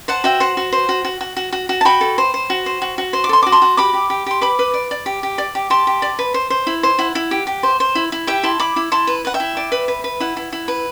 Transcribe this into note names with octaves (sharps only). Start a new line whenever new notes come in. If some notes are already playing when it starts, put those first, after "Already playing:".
C5 F#5 A5
F#4 E5 G5
C5 F#5
F#4
C5
F#4
F#4
F#4
F#4
F#4
F#4
A5
F#4 G5 B5
A4
C5
C5
F#4
C5
F#4
F#4
C5 C6
D6
A4 C6
F#4 D6
A5 C6
F#4
G4 B5 D6
G4
G4
G4 C6
B4 B5 D6
B4
D5
D5
G4
G4
D5
G4
G4 A5 C6
G4
D5
B4
C5
C5
E4
C5
E4 F#5
E4
G4
G4
C5
C5
E4
E4
G4 E5 G5
E4 A5 C6
E4 B5 D6
E4
E4 A5 C6
B4
B4 F#5
E5 G5
E4
D5
B4
B4
B4
E4 F#5
E4
E4
B4